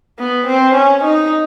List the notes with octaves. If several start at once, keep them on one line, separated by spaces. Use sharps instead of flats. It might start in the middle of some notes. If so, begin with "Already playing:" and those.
B3
C4
C#4
D#4